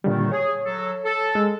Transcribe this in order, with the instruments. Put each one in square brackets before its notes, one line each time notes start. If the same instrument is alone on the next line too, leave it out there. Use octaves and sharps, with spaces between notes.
[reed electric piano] A#2 D3 G3 [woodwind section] D#3 A3
[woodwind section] G#4 [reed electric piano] C#5
[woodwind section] F#3 A4
A4
[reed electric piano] G#3